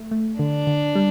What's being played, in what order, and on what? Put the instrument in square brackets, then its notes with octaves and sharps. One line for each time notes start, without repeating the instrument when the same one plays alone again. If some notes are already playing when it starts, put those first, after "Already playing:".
Already playing: [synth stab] A3
A3
[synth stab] D3 [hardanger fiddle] D4
[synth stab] D3
G3